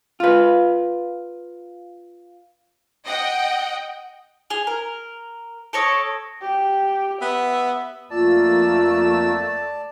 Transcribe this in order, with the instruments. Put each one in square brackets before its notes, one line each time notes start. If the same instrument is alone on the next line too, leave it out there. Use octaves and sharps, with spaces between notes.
[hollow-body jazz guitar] F4 B4
[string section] D#5 F#5 G5
[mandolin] G#4 [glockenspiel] F7 G7
[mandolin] A#4
[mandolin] A4 C#5 C#6 [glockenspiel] D#6 A#6 D7
[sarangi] G4
[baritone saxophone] B3 [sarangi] E5
[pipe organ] F2 A#3 E6 [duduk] A3 [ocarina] F4 [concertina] D5 A5